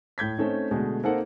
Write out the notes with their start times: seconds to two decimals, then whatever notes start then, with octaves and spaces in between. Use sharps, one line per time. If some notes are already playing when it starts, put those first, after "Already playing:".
0.18 A2 G6 G#6 B6
0.38 A3 C4 C#4 D#4
0.71 B2 D3 G#3 A3
1.04 A#3 C4 D#4 A4 C5 F#5